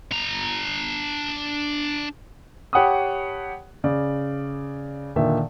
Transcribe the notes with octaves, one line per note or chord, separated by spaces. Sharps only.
D4 A#5
G4 C#5 F#5 A5 B5 D#6
C#3 D5
A#2 D3 D#3 E5